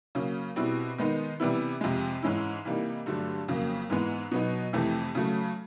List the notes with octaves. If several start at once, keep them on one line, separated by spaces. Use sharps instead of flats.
C#3 F#3 A#3 C#4
B2 G3 C4 E4
D#3 G#3 B3 D#4
C3 E3 G3 B3 E4
F2 C3 F3 G#3
G#2 E3 G#3 C#4 E4
C3 E3 G3 A#3 D#4
G2 D3 F#3 A3 D4
F2 C#3 F#3 A#3
G#2 E3 G#3 B3
B2 F#3 B3 D#4
F2 C3 E3 A3
C#3 F#3 A3